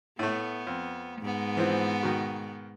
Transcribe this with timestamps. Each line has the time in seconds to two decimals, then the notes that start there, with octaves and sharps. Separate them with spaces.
0.19 A2 A3 B3
0.67 F2
1.21 G#2 B3
1.57 E3 F3 C4
2.03 B2 D#3